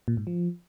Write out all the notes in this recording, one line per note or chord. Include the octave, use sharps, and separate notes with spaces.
A#2
G#2
F3